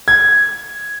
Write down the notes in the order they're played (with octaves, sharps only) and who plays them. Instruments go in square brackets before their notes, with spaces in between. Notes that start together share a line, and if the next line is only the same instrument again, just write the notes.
[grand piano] G#6